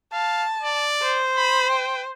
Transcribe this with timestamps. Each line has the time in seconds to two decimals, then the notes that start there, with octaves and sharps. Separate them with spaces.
0.13 F5 A5
0.63 D5
1.02 C5
1.37 B5
1.70 G5